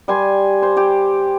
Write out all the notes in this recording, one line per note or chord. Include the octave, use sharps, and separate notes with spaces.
G3 G#5 C6
C5
G4